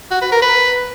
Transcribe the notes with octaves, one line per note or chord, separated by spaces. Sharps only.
F#4
B4
A#4
B4